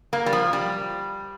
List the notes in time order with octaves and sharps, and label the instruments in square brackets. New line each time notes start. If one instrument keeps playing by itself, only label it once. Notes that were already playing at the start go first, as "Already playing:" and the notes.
[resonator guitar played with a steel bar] A#3
G3
F3
G3